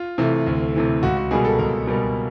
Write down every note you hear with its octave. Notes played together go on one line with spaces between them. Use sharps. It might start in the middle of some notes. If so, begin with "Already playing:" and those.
Already playing: F4
C3 E3 A3
D2
C3 E3 A3
C#2 F#4
F#4
B2 G3 A#3 G#4
A4
C#2 A#4
B2 G3 A#3